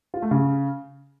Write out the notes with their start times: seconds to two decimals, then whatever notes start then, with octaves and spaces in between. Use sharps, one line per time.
0.14 F4
0.22 A3
0.31 C#3